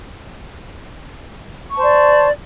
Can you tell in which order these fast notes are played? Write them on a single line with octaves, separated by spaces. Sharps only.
C#6 A5 C5 D5